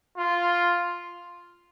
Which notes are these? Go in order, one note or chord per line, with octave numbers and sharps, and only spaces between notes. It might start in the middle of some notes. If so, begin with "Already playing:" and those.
F4